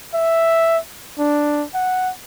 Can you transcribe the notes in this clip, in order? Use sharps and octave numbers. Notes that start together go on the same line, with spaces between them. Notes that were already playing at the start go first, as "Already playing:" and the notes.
E5
D4
F#5